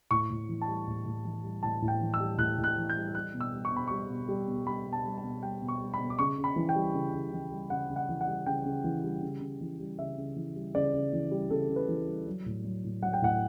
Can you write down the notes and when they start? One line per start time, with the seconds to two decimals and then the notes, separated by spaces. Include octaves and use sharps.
0.11 A2 C#6
0.30 A2
0.49 E3
0.62 A5
0.68 G3
0.87 A2
1.06 A2
1.25 E3
1.44 G3
1.63 A2 A5
1.82 A2
1.88 G5
2.01 E3
2.14 E6
2.20 G3
2.38 A2 F#6
2.58 A2
2.64 F#6
2.77 E3
2.90 G6
2.96 G3
3.14 G3 F#6
3.34 B2
3.41 E6
3.53 G3
3.65 C#6
3.72 B2 B5
3.88 G3 C#6
4.09 B2
4.28 G3
4.48 B2
4.66 G3 B5
4.86 B2
4.93 A5
5.04 G3
5.18 A5
5.23 B2
5.43 G3 G5
5.62 B2
5.68 C#6
5.81 G3
5.94 B5
5.99 B2
6.10 D6
6.19 C#3 C#6
6.38 C#3
6.44 B5
6.56 E3
6.69 G5
6.76 G3
6.94 C#3
7.13 C#3
7.33 E3
7.52 G3
7.70 C#3 F#5
7.90 C#3
7.96 F#5
8.09 E3
8.21 F#5
8.28 G3
8.46 C#3 G5
8.66 C#3
8.84 E3
9.04 G3
9.22 C#3
9.41 C#3
9.61 E3
9.80 G3
9.99 C#3 E5
10.18 C#3
10.36 E3
10.56 G3
10.75 C#3 D5
10.94 C#3
11.13 E3
11.31 G3
11.50 C#3 A4
11.69 C#3
11.76 B4
11.89 E3
12.07 G3
12.27 F#3
12.46 A2
12.64 F#3
12.84 A2
13.02 F#3 F#5
13.13 G5
13.22 A2 F#5